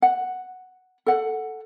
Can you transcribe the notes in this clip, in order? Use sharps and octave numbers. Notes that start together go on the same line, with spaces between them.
F#5
A4 F#5